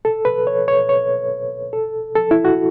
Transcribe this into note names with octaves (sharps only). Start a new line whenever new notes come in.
A4
B4
C#5
C#5
C#5
A4
A4
E4
F#4